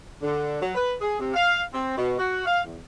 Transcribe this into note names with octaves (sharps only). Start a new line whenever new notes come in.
D3
F#3
B4
G#4
C3
F5
C4
B2
F#4
F5
E2